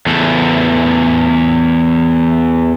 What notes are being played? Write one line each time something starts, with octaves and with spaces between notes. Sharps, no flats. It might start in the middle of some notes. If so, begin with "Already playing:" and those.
E2 A3